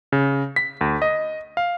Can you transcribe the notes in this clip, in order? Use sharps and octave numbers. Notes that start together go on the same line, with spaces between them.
C#3
B6
D2
D#5
F5